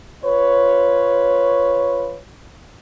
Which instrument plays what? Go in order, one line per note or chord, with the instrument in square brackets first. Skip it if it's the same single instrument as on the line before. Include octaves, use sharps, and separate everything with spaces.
[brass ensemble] F4 B4 C#5